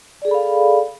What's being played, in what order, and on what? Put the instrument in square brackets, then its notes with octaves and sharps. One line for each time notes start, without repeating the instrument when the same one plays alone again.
[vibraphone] D5
G#4
A4
B5
F5